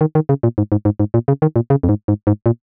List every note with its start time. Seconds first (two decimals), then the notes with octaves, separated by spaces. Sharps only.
0.01 D#3
0.15 D#3
0.29 C#3
0.43 A#2
0.58 G#2
0.72 G#2
0.85 G#2
1.00 G#2
1.14 A#2
1.28 C#3
1.42 D#3
1.56 A#2
1.70 C#3
1.83 F2
1.89 G#2
2.08 G#2
2.27 G#2
2.46 A#2